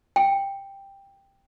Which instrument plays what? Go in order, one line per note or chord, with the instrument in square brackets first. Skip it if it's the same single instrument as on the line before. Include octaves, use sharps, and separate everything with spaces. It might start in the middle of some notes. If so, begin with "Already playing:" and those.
[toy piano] G5